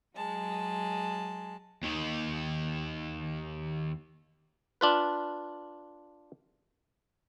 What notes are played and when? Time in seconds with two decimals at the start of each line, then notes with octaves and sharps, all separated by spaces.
0.14 F#3 G#3 A5
1.83 D#2 D#3
4.81 D4 F4 B4